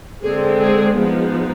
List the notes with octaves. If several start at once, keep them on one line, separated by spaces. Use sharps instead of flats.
D3 G#3 C4 G#4
G#4
F3 G#3 B3 D#4